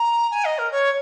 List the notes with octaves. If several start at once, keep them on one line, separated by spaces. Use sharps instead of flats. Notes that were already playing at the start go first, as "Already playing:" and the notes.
Already playing: A#5
G#5
D#5
A#4
C#5